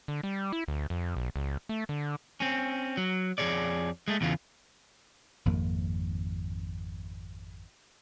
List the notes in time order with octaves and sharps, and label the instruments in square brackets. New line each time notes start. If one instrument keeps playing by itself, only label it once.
[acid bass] D3
G3
E4
D2
F2
B1
C#2
A3
D3
[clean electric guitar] C4 C#4
F#3
F2 F3 G#4 C#5 D5
G#3 A3
E2 C#3 E3 F4
[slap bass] G#1 F2 A#3